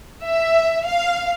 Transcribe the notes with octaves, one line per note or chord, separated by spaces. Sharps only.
E5
F5